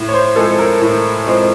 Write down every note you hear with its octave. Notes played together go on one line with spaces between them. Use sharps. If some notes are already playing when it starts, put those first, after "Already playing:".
Already playing: A2
C#5
C5
F3 G#3 C4 A4
A#4
A2
F3 G#3 C4